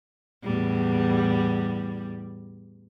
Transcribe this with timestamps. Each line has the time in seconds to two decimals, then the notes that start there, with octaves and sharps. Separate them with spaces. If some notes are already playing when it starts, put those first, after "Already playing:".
0.43 E2 A2 G3